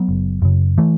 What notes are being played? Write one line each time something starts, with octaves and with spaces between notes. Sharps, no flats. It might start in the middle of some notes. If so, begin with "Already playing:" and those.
Already playing: F#3 B3
F#1
F#2 C#3
E3 A3